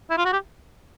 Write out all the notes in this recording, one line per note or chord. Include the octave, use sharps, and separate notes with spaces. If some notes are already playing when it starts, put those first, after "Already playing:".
E4
F4
F#4
G4